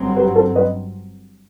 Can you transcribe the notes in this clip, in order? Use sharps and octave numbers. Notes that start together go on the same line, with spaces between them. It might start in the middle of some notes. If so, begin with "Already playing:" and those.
Already playing: G1 G2 F#3 C4
G4 B4
A4 C5
B4 D#5